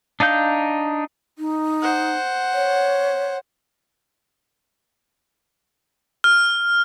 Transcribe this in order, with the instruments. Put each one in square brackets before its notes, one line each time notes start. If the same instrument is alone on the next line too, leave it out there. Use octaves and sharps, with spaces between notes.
[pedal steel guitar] D4 D#4 F5 G6
[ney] D#4
[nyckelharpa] C5 F#5
[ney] C#5
[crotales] F6